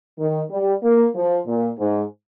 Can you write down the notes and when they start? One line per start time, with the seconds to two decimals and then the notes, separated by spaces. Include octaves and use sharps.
0.19 D#3
0.50 G3
0.82 A#3
1.14 F3
1.46 A#2
1.78 G#2